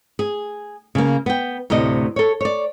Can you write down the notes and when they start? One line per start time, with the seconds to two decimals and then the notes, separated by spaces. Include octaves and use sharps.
0.19 G#4
0.95 C#3 A#3
1.26 B3 G5
1.70 D2 A2 C3 D#5
2.16 A4 C#5
2.41 C#5 D5